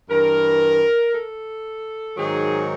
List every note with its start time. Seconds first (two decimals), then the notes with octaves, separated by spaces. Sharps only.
0.10 G2 E3 A#4
1.14 A4
2.17 G#2 D#3 F#3 G#4